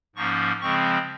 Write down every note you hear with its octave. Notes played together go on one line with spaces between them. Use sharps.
G#2 F3 A#3 C#4 C#6
C#3 F3 G#3 C4 C#6